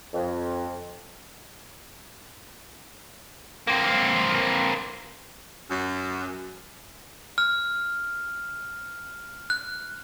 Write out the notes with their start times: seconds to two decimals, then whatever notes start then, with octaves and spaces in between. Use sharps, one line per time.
0.14 F2
3.67 A#3 C4
5.70 F#2
7.38 F6
9.50 F#6